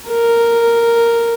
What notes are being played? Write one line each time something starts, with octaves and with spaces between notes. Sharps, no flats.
A#4